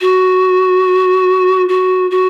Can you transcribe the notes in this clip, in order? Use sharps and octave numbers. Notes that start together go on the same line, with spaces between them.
F#4
F#4
F#4